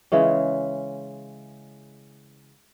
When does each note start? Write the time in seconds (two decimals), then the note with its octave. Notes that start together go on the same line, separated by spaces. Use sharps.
0.12 C#3 E3 G#3 C#4